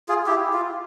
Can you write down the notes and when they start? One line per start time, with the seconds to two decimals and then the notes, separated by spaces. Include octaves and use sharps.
0.09 F4 G#4
0.26 E4 G4
0.53 F4